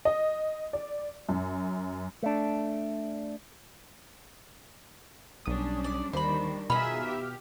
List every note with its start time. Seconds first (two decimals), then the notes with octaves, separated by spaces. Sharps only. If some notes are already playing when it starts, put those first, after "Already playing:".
0.05 D#5
0.73 D5
1.29 F#2
2.23 A3 D4
5.46 B1 G3 C#4 D4 D#6
5.84 D5
6.13 D#2 D#3 G3 D4 C5 B5
6.70 B2 D#4 F4 G#4 E5 B5 F6
7.05 G4